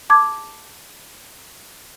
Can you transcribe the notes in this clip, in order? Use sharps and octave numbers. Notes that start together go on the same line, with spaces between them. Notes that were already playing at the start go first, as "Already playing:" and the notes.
A5 D6 G#6